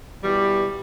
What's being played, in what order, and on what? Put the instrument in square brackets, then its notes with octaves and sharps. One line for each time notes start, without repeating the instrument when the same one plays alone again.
[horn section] B2 E3 G3